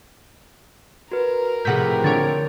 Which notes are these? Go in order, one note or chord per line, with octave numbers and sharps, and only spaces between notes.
F#4 A#4 B4
A2 C3 F3 G#4 F#5 G6 B6
D3 C#5 A6 D7